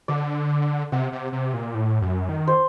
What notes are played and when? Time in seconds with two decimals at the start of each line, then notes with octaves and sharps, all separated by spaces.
0.08 D3 D5
0.92 C3 F#5
1.12 C3
1.32 C3
1.54 A#2
1.74 A2
2.01 F#2
2.29 D#3
2.47 C5